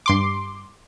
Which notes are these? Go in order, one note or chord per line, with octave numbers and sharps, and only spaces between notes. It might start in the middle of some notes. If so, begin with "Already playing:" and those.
G2 C6 D6